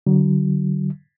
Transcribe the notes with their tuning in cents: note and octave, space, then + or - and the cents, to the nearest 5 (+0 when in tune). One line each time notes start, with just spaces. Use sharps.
D3 +5 F#3 +35